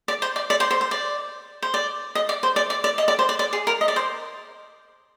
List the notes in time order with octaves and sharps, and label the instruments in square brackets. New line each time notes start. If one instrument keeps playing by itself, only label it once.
[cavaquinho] D5
C5
D5
D5
C5
C5
C5
D5
C5
D5
D#5
D5
C5
D5
D5
D5
D#5
D5
C5
D5
D5
G#4
A#4
D#5
D5
C5